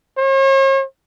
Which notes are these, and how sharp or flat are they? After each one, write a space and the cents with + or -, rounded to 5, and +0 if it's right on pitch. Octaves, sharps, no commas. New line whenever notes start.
C#5 -45